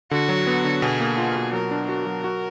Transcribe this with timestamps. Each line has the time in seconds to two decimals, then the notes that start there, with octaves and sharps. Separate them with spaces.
0.11 D3 F#4
0.29 F#3
0.47 B3
0.65 D3
0.82 B2 G#4
1.00 A#3
1.18 F4
1.36 B2
1.53 F#3 A#4
1.71 D4
1.89 F#4 A#4
2.06 F#3
2.24 F#4